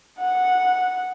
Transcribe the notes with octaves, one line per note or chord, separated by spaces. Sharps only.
F#5